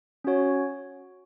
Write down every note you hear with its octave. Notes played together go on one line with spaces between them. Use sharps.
C#4 F#4 C#5